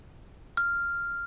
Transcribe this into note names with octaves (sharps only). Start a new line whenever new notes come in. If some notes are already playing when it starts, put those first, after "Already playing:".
F6